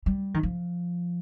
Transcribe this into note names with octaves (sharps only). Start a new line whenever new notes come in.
G3
D#3
F3